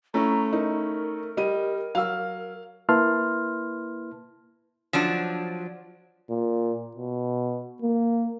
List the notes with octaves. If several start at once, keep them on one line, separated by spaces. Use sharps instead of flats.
A3 C#4 E4 A#5
D#4 A#4
G3 D#5 D#7
F#3 F5 E6 F6
A#3 E4 B4 A5 C6 F6
F3 F#3 D4
A#2
B2
A#3